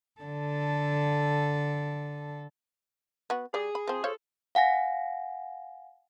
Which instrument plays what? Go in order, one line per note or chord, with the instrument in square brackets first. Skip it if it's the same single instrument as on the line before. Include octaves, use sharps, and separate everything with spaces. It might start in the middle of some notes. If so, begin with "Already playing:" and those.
[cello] D3 A4
[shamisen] B3 F#4
[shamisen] G3 D5 [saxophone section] G#4
[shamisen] B5
F3 C4
[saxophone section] F4 G#4 A4 [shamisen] C5 C#5 F5
[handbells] F5 F#5 G#5 A#6